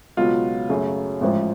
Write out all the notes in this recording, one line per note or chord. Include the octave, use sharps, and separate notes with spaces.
C#2 B2 F#3 B3 F4
F#2 C#3 F#3 A3
A1 G#2 F3